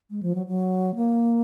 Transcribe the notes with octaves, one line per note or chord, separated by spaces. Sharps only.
G#3
F3
F#3
F#3
A#3